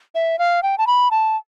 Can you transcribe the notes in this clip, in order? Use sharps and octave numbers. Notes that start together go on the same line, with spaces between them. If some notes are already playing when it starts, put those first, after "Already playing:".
E5
F5
G5
A5
B5
A5